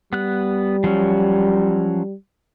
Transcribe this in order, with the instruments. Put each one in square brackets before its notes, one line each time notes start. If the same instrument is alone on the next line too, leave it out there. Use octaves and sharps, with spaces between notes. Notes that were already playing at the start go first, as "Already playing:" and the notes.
[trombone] G3 [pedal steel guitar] B3 F#6
[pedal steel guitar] F3 F#3 C#4